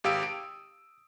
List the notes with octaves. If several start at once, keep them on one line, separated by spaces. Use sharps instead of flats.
G#1 G4 F5 D#6 E6 D7
D7